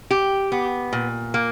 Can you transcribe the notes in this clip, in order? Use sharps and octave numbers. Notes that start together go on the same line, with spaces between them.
G4
B3
A#2
A#3